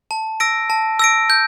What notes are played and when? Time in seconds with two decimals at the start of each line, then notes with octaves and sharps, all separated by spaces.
0.11 A5
0.40 E6 A#6 D7
0.70 A5
0.99 E6 A#6 D7
1.30 G6